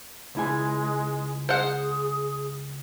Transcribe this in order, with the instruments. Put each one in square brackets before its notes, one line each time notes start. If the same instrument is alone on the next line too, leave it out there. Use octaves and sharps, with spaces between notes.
[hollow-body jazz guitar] C#2 E4 G#5 [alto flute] G#3
[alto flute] G#4 [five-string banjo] C5 F#5